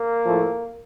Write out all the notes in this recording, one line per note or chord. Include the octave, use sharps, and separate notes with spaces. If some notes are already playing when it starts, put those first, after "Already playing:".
Already playing: A#3
A2 F3 A3